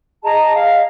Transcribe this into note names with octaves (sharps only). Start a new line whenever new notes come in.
G#4 D#5 A5 A#5
G#4 D#5 F5